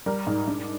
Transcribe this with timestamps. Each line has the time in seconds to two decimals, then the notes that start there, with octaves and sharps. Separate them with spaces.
0.06 G3 A#4
0.27 G#2
0.47 G#2 D4